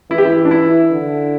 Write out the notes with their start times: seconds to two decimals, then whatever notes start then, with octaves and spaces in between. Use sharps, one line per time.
0.11 E3 E4
0.18 G4
0.25 E4
0.45 D4
0.51 E4
0.91 D3